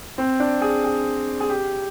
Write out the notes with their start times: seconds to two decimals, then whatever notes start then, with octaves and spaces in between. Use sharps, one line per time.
0.18 C4
0.40 D4
0.61 G#4
0.84 G#4
1.40 G#4
1.49 G4